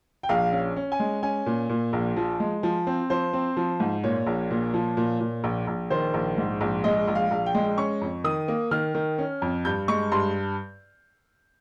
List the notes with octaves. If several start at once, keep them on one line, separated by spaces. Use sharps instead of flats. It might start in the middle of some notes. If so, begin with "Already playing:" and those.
G5
A#1 F5
C#4
C#4
G#5
G#3
C#4 G#5
A#2
A#2
A#1
F3
G#3
F3
C4
F3 C5
C4
F3
G#2
A#2 C#5
A#1
A#2
F3
A#2
A#2
A#1
A#1
D#3 C5
A#1
G#2
A#1
G#3 D#5
A#1
F5
A#1
G5
G#3
C#4 C#6
F2
D#3 D#6
A#3
D#3 F6
D#3
C#4
F2
G2 G6
G#3 C#6
G2 C6